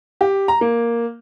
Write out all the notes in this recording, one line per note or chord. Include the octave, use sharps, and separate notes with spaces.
G4
A#5
A#3